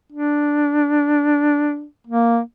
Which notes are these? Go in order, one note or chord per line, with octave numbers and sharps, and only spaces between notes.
D4
A#3